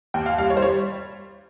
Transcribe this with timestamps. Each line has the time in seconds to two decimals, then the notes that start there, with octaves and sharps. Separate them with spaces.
0.14 D#2 G5
0.26 F5
0.38 G3 F5
0.50 C#5
0.57 C5
0.62 G3 C#5